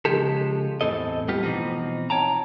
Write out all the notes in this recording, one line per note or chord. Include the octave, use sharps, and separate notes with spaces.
C#3 E3 F3 G#3 G4 A4
E2 A2 C4 A4 D#5
G3 A3 B3 F4 G4
B2 E3 F3 C4 D#4
C#5 G5 A5 A#5